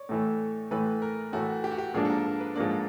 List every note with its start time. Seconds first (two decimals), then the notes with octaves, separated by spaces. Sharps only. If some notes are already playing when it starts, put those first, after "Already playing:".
Already playing: C#5 D5
0.09 A2 E3 A3
0.71 A2 E3 A3 B4
1.02 A#4
1.33 A2 E3 A3 F#4
1.64 G4
1.71 F#4
1.78 G4
1.94 G#2 F3 A#3 D4 G#4
2.05 A4
2.10 A#4
2.26 A#4
2.40 B4
2.55 G#2 F3 A#3 D4 D5